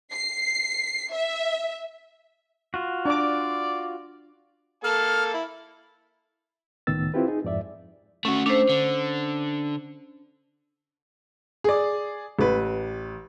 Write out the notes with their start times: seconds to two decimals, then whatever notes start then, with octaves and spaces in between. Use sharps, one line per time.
0.12 C7
1.13 E5
2.74 F4 F#4
3.05 D4 D5 D6
4.84 A#3 A4 A5 F6
5.34 E4
6.87 C#2 A2 D#3 B3 E6 A6
7.14 C4 E4 F4 G4 B4
7.28 D#4 G#4
7.44 F2 G#2 D5 E5
8.25 A3 C#4 F#4
8.46 A3 D4 C5
8.69 D3
11.64 G#4 D5
12.39 A1 B4